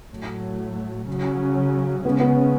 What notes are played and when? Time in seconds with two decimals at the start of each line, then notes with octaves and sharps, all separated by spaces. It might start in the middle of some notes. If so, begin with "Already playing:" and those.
0.10 A2 F#3 A3
1.08 C#3 F#3 C#4
2.05 C#3 G#3 B3 C#4
2.20 B3